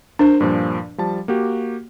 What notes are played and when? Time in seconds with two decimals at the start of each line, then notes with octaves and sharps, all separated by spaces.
0.19 D4 A#4 C5
0.41 G2 A#2 F3
0.98 F3 G3 A5
1.28 A#3 F#4 G4